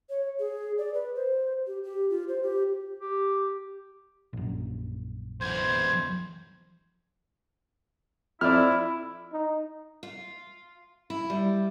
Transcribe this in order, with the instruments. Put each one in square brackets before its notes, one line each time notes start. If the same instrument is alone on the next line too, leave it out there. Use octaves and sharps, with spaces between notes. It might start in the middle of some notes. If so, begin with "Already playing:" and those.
[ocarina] C#5
G#4
D5
B4
C5
G4
G4
F4
C5
G4
[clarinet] G4
[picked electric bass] A#1 F#2
[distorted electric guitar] B1 E3 [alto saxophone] C5 [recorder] G#6
[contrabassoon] F2 [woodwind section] E4 [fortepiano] D5 F6
[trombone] D#4
[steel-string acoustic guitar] F4
E4
G3